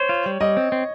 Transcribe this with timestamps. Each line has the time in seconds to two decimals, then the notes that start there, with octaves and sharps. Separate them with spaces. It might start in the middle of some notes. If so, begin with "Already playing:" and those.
Already playing: C5 C#5
0.09 F4
0.26 G3
0.40 G3 D#5
0.57 C4
0.72 C4